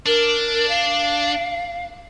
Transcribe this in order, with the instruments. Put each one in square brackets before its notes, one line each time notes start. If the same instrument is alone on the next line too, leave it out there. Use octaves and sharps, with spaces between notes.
[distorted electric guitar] D4 [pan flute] A#4
[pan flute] F5